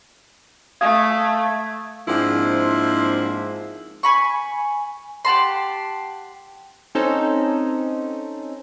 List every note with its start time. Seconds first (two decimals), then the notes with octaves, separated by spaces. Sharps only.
0.81 A3 F5 D#6 G#6
2.08 G#2 F3 A#3 C4 D4 E4
4.03 G#5 B5 C#6
5.25 G4 F#5 A5 C6
6.95 C4 C#4 D#4 A4 C5